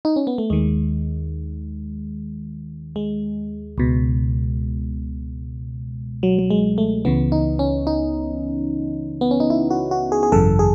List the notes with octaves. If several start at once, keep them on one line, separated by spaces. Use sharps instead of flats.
D#4
C#4
B3
A3
D#2 D#3 G#3
G#3
C#2 B2
F#3
F#3
G#3
A3
C#2 C#3 E3 B3
D#4
C#4
D#4
B3
C#4
D#4
E4
F#4
F#4
G#4
G#4
G#1 F#2 C#3 E3 A4
G#4